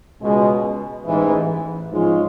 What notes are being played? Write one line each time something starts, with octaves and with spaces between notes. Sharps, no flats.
C#2 B2 G#3
A1 G#2 E3
G#2 F3 G#3 C#4 F4